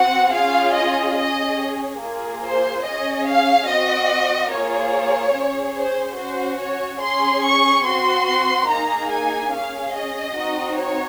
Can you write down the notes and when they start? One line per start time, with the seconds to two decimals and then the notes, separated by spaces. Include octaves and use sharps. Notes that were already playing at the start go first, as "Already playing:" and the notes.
Already playing: C4 F#4 F#5
0.33 C#4 F4 G#4 F5
0.76 D#5
1.16 C#4 G#4 D#5
2.00 A#3 F4 G#4
2.43 C5
2.83 C#4 G#4 D#5
3.26 F5
3.67 C4 F#4 D#5
4.51 A#3 F4 G#4 C#5
5.34 C#4 G#4
5.76 C5
6.18 C#4 F#4 C5
6.59 C#5
7.01 C#4 G#4 C6
7.44 C#6
7.85 C4 F#4 C6
8.69 A#3 D#4 G#4 A#5
9.10 G#5
9.52 C#4 G#4 F5
9.94 D#5
10.36 C4 D#4 F#4
10.77 C#5